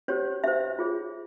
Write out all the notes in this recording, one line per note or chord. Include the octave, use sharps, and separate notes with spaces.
C#4 G4 C5 C#5
C#4 G4 C5 E5
F4 G#4 C#5